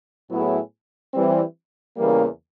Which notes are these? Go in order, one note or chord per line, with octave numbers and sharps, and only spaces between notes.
A2 F#3 B3 E4 G#4
E3 G3 C4
E2 C#3 E3 G3 A#3